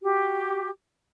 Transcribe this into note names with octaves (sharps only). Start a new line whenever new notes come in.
F#4 G4